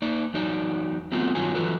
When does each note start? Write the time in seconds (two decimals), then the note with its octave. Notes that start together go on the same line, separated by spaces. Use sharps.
0.02 A#3 D#4 D5
0.34 E2 F#3 D#4 D5
1.12 F#3 A3 B3 C4 F4
1.35 G2 D#3 F#3 F4 C#5 G#5
1.54 E3 F#3 F4 A4 B4